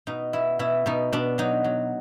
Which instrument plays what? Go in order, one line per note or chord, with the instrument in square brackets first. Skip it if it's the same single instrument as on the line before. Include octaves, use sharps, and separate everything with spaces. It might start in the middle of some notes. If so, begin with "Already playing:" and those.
[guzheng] B2 D#4
B2 E4
B2 E4
B2 D#4
B2 D4
F#3 D#4
F#3